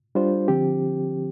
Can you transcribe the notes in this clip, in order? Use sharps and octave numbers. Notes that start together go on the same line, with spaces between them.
G3 D4 F4 C5
D3 F3 C4 G4